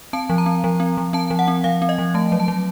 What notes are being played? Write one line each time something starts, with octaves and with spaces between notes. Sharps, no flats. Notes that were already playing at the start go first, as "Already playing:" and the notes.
C4 A5
F3
A#5
C4
F3
C4
F3
C4 A5
F3
F#5
C4
F3 F5
C4
D#5
F3
A3 A5
F#3
A5
F#3